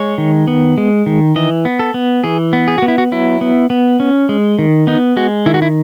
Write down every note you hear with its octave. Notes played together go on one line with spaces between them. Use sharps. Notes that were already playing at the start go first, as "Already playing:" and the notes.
Already playing: G#3 C#5
D#3
B3
G#3
D#3
E3 D#5
B3
A4
B3
E3 G#4
B3
G#4
B3 F#4
E4
F#4
F#3 E4
B3
B3
C#4
G#3
D#3
B3 D#4
G#3 F#4
D#3 E4
F#4
E4